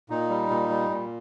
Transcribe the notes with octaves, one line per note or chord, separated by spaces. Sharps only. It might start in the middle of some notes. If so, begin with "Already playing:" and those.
A#2 D#4
G3
A#2
G3
A#2